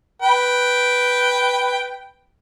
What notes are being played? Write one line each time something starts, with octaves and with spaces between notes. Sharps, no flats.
B4 G5